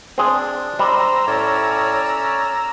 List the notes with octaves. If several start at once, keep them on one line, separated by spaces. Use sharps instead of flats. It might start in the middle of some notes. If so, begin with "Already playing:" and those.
C4 D4 G#4
G3 C5 A#5 E6
A2 C#4 C#5 D5